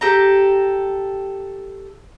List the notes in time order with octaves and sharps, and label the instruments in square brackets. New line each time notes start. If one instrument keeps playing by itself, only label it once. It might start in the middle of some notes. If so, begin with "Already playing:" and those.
[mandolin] G4 A4 A#5